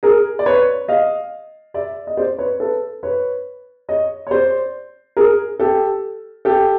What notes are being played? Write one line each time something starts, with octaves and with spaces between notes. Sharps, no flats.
G#4 A#4
D5
B4 C#5
D#5 F5
D5 E5
D#5
C5 D5
B4 C#5
A4 B4
B4 C#5
C#5 D#5
C#5
C5 D5
G#4 A#4
G4 A4
G4 A4